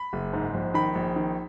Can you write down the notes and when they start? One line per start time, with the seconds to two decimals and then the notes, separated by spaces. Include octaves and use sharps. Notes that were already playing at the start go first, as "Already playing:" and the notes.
Already playing: B5
0.13 F#1
0.33 G#2
0.54 A#1
0.74 D#3 B5
0.95 A#1
1.16 D#3